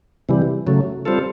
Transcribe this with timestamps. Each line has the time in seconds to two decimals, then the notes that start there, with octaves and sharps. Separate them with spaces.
0.29 C3 E3 G3
0.67 C#3 F#3 A3
1.05 G3 C4 F4 A4